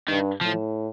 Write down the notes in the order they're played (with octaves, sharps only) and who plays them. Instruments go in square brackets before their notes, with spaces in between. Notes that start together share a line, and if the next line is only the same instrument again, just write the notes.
[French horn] G2 [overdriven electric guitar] D#3
[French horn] A2 [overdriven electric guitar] F3